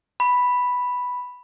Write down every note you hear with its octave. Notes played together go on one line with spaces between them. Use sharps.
B5